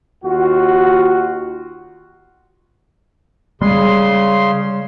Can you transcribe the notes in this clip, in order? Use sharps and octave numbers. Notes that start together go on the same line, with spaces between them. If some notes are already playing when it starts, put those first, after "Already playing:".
D#2 F4 F#4
C#3 G3 G#3 C6